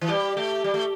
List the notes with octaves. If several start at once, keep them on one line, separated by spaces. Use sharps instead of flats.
E3
G3 G4
A3 G4
G3
A3